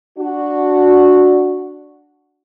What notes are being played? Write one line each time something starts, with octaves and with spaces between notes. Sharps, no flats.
D4 F#4